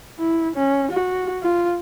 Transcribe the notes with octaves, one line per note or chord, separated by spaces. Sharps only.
E4
C#4
F#4
F4